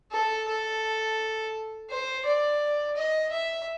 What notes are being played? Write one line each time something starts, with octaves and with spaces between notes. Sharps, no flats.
A4
A4
C5
D5
D#5
E5